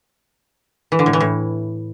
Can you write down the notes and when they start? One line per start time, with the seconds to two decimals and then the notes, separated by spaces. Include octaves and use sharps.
0.92 E3
0.99 D3
1.06 A2
1.13 E3
1.20 A2